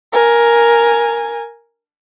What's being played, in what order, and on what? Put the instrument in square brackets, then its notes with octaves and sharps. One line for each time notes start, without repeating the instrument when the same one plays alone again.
[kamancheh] A#4 G#5